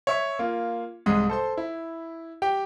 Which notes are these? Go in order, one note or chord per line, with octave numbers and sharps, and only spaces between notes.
C#5 E5 C#6
A#3 F4
C2 G#2 G#3 D#6
A4 C5 C6
E4
G4 G5